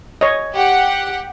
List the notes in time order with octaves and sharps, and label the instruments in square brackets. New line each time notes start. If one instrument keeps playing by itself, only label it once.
[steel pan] C#5 D#5
[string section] G4 F#5